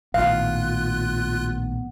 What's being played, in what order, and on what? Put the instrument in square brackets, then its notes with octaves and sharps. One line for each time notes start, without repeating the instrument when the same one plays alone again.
[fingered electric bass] A#1 A2 D#3 [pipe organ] B3 [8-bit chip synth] F4 F#6 [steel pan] F5